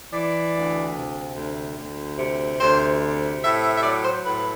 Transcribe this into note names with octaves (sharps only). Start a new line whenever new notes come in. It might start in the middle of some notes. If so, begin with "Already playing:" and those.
E3 D5
D2
C3
D2
D2
C3
D2 C5
C3
A2 E5
E5
E5
F#3 D5
C5
A2 B4